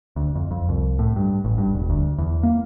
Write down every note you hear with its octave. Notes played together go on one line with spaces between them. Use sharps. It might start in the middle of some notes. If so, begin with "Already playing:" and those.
D2
F2
F2
C2
A2
G2
A1
G2
E1
D2
E2
A#3